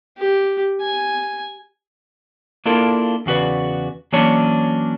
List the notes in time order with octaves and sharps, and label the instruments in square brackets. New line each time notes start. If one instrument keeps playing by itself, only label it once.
[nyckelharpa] G4
G#5
[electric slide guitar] A#3 D4 E4 F4 A4 A#4
E2 C#3 F#4 B4 D5
E3 F#3 A#3 C#4 D4 C#5